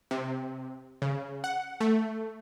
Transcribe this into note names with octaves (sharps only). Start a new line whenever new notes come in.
C3
C#3
F#5
A3